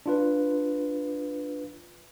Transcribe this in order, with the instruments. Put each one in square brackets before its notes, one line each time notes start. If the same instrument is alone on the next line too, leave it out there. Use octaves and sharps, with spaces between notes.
[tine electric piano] D4 F4 B4